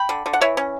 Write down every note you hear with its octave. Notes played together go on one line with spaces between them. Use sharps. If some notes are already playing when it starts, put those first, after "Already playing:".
Already playing: G5 B5
D3
D3
F#5
E3 C#5 E5
C#4